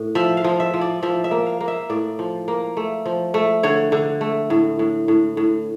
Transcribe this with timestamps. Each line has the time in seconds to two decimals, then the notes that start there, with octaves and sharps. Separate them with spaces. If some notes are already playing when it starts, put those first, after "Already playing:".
Already playing: A2
0.15 F3 E5
0.37 F5
0.44 F3
0.60 E5
0.74 F3
0.81 D5
1.03 F3 E5
1.24 E5
1.31 A#3
1.46 F5
1.61 A#3
1.68 E5
1.90 A2 D5
2.19 F3
2.48 A#3
2.77 A3
3.06 F3
3.34 A3
3.63 D3 C#5
3.92 D3
4.21 A3
4.50 A2
4.79 A2
5.08 A2
5.37 A2